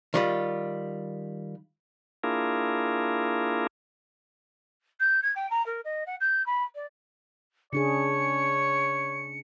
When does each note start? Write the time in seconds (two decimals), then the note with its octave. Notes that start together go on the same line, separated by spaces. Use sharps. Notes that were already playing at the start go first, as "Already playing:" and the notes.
0.14 D#3 G3 F4
2.24 A#3 D4 E4 F4 G#4 A#4
5.00 G6
5.23 G#6
5.36 G5
5.51 A#5
5.66 A#4
5.85 D#5
6.07 F#5
6.21 G6
6.46 B5
6.75 D5
7.73 C#3 D4 G#4 C#5 C#7